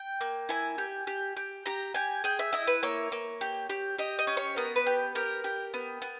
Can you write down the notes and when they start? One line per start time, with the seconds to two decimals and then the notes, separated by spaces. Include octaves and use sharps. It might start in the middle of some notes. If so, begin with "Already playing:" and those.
Already playing: G5
0.21 A#3
0.49 E4 G#5
0.78 G4
1.07 G4
1.36 G4
1.66 G4 A#5
1.94 G4 G#5
2.24 G#4 G5
2.39 E5
2.53 E4 D#5
2.67 B4
2.83 A#3 C#5
3.12 A#3
3.41 G4
3.69 G4
3.98 G4 D#5
4.19 D#5
4.27 C#4
4.37 C#5
4.56 B3 A#4
4.76 B4
4.87 G4
5.15 G4 A#4
5.44 G4
5.74 B3
6.02 B3